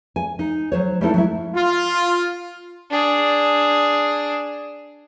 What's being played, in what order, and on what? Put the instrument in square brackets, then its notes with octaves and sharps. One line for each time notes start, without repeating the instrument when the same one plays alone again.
[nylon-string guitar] G#5
D#4
F#3 C5 C#5
G3 A3 B3 D#4 E4 A4
F#3 E4
[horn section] F4
[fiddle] D4 G#4